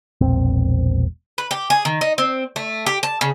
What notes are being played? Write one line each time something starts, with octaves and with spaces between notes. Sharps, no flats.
E1 A#1 C4
B4
G4
G#4
D#3
D#4
C4
A3
G4
A5
C#3